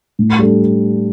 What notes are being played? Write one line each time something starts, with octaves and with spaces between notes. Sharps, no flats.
A2
G3 D4 A4